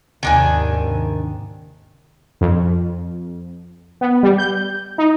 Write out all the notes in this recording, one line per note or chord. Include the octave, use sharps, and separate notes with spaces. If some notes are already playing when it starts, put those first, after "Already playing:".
D#2 G#2 C3 D#3 D4 G#5
F2
B3
G3
G6
D#4